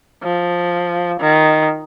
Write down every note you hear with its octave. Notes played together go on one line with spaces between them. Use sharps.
F3
D#3